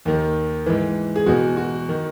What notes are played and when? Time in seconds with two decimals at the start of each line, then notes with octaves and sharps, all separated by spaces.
0.05 D#2 D#3
0.66 G#2 E3
1.16 G#4
1.26 E2 B2 F#4
1.57 F#4
1.89 D#3